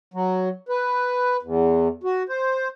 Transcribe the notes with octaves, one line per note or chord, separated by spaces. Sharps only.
F#3
B4
E2
F#4
C5